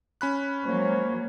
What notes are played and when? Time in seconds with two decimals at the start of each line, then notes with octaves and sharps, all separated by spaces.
0.21 C#4 B5 F#6
0.64 F#3 G#3 A#3 C5 C#5